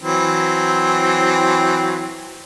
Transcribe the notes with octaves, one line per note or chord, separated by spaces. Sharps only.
E3 F#3 C4